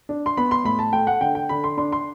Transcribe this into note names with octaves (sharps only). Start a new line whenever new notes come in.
D4
C6
B3 B5
C6
A2 B5
A5
A3 G5
F#5
D3 G5
G5
D3 B5
C6
D4 C6
C6